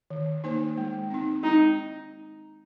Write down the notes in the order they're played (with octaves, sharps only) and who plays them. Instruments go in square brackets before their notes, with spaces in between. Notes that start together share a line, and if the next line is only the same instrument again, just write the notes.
[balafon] D#3
A#3 D#4 C5
G#3
C4 D#4
[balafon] G#3 [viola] D#4